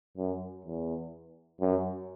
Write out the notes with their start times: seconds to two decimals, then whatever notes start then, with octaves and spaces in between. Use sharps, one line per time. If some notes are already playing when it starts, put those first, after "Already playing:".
0.17 F#2
0.65 E2
1.61 F#2